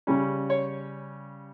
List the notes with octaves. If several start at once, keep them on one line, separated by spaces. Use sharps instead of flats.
C#3 G3 C#4
C#5